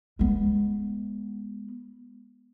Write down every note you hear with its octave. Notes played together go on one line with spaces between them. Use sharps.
G#3 B3